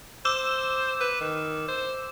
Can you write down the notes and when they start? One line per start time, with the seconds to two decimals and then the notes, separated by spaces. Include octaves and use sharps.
0.25 C5 D6 E6 E7
1.00 B4
1.21 D#3
1.68 C5